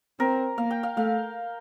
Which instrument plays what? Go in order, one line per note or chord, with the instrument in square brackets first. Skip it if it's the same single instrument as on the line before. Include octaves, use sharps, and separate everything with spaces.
[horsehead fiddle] C4 [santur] A#4
[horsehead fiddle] A#3 [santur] F5
[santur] G5
F5
[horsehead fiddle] A3 [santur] F5